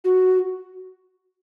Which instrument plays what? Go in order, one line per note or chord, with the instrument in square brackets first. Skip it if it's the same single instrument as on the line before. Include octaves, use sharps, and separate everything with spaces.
[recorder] F#4